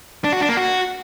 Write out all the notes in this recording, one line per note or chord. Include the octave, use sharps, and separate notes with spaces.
D4
F#4
D4
A#3
F#4